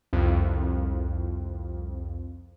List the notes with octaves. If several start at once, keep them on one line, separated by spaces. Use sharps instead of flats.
C2 F2